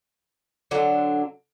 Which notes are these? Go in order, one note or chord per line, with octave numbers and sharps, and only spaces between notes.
D3 F#3 D4